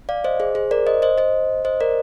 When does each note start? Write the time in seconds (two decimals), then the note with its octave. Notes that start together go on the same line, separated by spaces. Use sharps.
0.09 D5 F5
0.24 C5 D#5
0.40 G#4 C5
0.55 G#4 C5
0.71 A#4 D5
0.87 C5 D#5
1.02 C5 D#5
1.18 C5 D#5
1.65 C5 D#5
1.80 A#4 D5